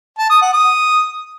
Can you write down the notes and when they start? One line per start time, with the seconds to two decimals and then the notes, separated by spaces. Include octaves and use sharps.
0.19 A5
0.30 D#6
0.42 F#5
0.53 D#6